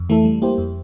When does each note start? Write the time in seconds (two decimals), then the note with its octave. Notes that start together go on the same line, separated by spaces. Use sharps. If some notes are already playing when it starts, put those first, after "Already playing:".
Already playing: F2
0.09 E3 A3 E4 A4
0.25 G3
0.42 A#3 E4 G4 C5
0.58 F2